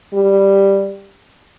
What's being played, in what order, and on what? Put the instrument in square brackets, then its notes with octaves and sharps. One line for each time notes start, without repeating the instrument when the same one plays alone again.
[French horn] G3